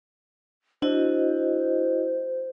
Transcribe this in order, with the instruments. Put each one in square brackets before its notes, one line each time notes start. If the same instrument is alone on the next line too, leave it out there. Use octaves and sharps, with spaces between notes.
[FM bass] D4 [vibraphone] E4 F#4 D#5 [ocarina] C5